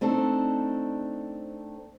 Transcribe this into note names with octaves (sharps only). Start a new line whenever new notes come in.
A3 C4 D4 D#4 A4